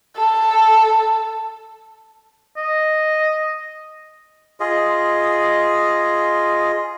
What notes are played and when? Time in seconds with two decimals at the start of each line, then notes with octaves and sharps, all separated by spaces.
0.16 A4
2.57 D#5
4.60 F4 G#4 D#5